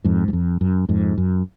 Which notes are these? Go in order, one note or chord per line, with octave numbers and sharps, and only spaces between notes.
F2 G#2
F#2
F2
F#2
F2 G#2
F#2